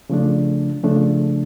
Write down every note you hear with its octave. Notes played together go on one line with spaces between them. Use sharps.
C#3 F3 A3 D4
C#3 F3 A3 D4